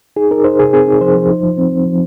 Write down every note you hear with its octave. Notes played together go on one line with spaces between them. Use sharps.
D#4 G#4
D#4 A#4
D#4 C5
C3 G#4
C4 G#4
D#4
F3 C5
F3
D#4
F3
C4
C4
F3